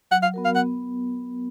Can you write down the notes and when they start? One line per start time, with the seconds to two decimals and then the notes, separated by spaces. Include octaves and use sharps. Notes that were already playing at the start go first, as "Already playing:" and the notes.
0.11 F#3 F#5
0.23 F5
0.34 B3 F#4 A#4
0.45 F5
0.55 B3 F#5